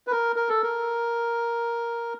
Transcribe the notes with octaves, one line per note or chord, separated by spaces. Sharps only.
B4
A#4
A#4
A4
A#4